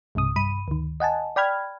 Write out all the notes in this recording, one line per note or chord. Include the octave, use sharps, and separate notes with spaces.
B1 G2 C3 D#6
G2 B5 D#7
D2 D#3
D#5 F#5 G#5 A5
D5 G5 B5 F6 G#6